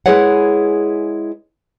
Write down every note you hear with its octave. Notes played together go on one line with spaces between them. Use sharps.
G#3 E4 G#4 B4 C#5 F#5